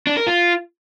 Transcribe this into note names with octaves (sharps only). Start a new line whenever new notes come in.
D4
A#4
F4